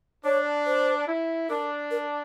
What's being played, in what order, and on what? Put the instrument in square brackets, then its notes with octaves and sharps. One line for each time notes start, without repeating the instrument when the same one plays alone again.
[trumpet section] D4 [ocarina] C#5
[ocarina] C5
[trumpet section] E4
[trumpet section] D4 [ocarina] A#4
[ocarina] A#4